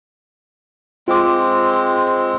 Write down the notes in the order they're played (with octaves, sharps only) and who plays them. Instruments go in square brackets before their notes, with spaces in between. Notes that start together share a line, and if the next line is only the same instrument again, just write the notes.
[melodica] G#3 C4 [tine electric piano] F4 D6